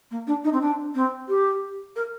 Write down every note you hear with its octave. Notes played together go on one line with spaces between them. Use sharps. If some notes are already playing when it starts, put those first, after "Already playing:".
A#3
D4
D#4
C4
D4
C4
G4
A#4